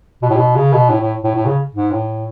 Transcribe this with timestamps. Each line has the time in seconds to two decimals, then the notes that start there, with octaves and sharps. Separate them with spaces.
0.22 B2
0.29 A2
0.36 B2
0.56 C#3
0.73 B2
0.90 A2
1.01 A2
1.24 A2
1.35 A2
1.46 C#3
1.75 G#2
1.91 A2